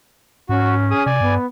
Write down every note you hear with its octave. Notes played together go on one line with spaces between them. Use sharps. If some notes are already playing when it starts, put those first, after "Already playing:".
G#2 C#4 F#4
G#4 D#6
C3 D5 G#5
G2 B3